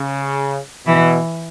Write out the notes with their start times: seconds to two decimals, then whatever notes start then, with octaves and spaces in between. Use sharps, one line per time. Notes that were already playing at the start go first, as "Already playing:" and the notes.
Already playing: C#3
0.86 B2 E3